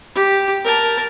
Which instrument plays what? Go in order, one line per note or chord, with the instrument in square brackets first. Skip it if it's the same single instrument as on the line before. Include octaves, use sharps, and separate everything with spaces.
[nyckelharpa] G4
A#4 A5